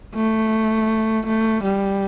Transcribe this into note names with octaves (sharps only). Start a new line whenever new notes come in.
A3
A3
G3